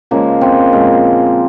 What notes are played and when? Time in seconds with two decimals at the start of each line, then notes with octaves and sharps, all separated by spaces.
0.11 C#3 F3 G#3 A#3
0.41 C4
0.73 A#2 F3 G#3